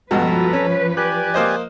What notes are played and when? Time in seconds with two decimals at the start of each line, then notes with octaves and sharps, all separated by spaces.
0.11 C#2 G2 B2 F3 F#4 A4 B4 A#5
0.53 C#4 C#5
0.97 G4 D5 G#5 F#6
1.34 A#3 C5 D#5